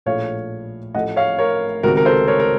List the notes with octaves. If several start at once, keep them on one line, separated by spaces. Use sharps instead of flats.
A#1 A2 F3 A3 C#5 F5
A1 A2 F3 A3 D#5 F#5
C#5 F5
A#4 C#5
C#2 C3 D#3 F#4 A#4
A#4
A4 C5
A#4 C#5
A#4